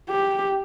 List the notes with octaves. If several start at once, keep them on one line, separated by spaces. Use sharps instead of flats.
G4